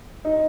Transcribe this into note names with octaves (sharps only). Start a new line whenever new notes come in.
D#4